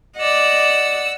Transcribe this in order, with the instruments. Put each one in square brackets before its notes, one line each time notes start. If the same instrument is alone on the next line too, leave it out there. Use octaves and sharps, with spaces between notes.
[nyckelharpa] D5 D#5 [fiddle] F#5 E6